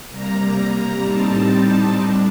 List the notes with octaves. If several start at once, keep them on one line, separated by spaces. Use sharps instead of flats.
C3 G3 A#3 A#5
A2 G3 C4 D#4 A5
A2 G3 D4